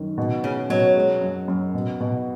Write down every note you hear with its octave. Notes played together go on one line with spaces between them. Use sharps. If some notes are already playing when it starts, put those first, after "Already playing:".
Already playing: F#2 D#3
B2
C#3 C#4
B2 F#3
G#3
F#2
F#2
B2
B2